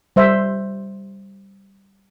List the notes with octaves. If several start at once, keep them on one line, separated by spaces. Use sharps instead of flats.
G3 C5 E5